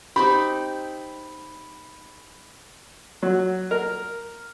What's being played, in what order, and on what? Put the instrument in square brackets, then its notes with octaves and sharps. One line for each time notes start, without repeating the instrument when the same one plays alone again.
[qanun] C4 D#4 G4 [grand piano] B5
[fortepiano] F#3
A#4